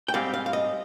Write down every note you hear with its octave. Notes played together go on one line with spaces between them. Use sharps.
G5
G#2 G3 C4 F5
F5
F5
D#5